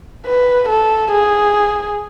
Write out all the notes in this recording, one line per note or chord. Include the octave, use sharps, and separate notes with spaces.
B4
A4
G#4